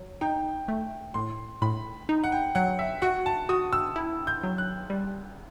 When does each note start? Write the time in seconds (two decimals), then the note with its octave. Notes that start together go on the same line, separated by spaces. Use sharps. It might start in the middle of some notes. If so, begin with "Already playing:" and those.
Already playing: F#3
0.21 D#4 G5
0.68 A3
1.14 A2 C6
1.62 A2 B5
2.09 D#4
2.24 F#5
2.32 G5
2.55 F#3 F#5
2.79 E5
3.02 F#4 F#5
3.26 A5
3.49 F#4 D#6
3.73 E6
3.96 E4
4.27 G6
4.43 F#3
4.58 F#6
4.90 G3